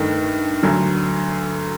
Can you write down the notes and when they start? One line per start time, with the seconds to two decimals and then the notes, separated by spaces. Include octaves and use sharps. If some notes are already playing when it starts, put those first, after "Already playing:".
Already playing: G2 D#3 A3
0.63 D2 D3 F#3